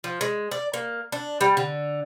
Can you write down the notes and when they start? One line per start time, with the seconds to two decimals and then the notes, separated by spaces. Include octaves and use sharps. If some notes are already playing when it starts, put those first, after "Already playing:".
0.04 F3
0.21 G#3
0.51 D5
0.74 A#3
1.12 D4
1.41 G3
1.57 D3